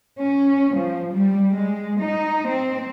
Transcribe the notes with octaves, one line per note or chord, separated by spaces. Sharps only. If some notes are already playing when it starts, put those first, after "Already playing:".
C#4
F3
G3
G#3
D#4
C4